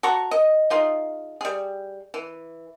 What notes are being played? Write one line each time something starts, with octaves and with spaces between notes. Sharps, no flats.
F#4 A4 A#5 C#6
D#5
D#4 F4 G#4
G3 G#4
E3